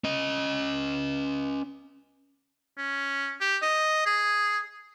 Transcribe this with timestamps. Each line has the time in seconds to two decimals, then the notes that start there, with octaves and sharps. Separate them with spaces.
0.04 C#4 D#5
2.77 C#4
3.41 G4
3.62 D#5
4.06 G#4